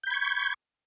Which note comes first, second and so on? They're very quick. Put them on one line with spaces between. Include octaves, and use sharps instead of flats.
G6 B5 G#6 C#6